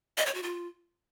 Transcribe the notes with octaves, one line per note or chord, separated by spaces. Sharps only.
D#5
C#5
F#4
F4